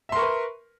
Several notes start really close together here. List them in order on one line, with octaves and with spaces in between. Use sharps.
E5 C6 A#4 C#6 B4